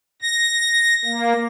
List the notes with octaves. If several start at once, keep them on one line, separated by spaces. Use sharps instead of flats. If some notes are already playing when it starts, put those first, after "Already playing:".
A#6
A#3